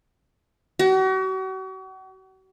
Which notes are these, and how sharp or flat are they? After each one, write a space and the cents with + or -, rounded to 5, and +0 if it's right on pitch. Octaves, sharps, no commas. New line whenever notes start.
F#4 +40